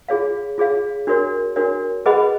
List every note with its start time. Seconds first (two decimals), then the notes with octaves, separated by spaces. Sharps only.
0.08 F4 G#4 C#5 F5
0.58 F4 G#4 C#5 F5
1.07 D4 F#4 A#4 C#5
1.56 D4 F#4 A#4 C#5
2.06 G#4 B4 D#5 F#5 B5